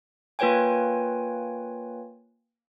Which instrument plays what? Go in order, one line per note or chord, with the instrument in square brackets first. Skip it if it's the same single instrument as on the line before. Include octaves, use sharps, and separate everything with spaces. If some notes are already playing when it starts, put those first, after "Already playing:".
[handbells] A#3 F4 B4 C#5 G5 G#5